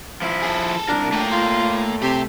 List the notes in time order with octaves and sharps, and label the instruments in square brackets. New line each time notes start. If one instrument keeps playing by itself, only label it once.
[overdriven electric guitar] F3 E4
[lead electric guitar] G#4 A4
[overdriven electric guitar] C2 A#4 [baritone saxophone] D4
[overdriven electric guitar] A3 G5 [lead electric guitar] A#3
[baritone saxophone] F4
[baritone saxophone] C3 [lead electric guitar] G4